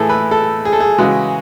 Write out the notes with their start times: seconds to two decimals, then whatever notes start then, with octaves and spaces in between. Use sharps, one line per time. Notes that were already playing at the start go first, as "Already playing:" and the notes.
Already playing: A2 E3 G#4 A4
0.09 B4
0.31 A4
0.65 G#4
0.73 A4
0.80 G#4
0.98 C#3 E3 G#3 F#4